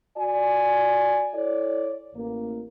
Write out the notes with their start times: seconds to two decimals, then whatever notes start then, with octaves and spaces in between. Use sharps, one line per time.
0.18 F#4 D5 G#5
1.34 E4 A4 C#5 D5
2.15 A1 A#3